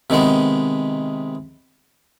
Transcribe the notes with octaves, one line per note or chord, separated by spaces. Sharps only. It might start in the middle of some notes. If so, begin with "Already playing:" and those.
C3 D#3 G#3 B3